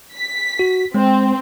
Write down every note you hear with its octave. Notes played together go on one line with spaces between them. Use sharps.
B6
F#4
G#3 C4